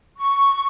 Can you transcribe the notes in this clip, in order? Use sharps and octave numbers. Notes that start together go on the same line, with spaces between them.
C#6